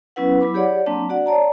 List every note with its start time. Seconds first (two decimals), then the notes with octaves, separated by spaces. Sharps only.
0.16 F#3 B3 C#4 E4 B4 F#5
0.41 F#3 E4 B5 D6
0.54 G4 G#4 C#5 D5 F#5
0.86 F#3 A#3 C4 D4 A5
1.09 F#4 D5 F#5
1.26 C#5 D5 A5 A#5